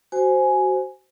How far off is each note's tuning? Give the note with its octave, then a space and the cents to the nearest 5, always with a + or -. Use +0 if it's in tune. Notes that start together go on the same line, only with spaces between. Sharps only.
F#4 +20 C5 +0 G#5 +10